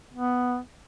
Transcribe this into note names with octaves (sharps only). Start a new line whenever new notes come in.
B3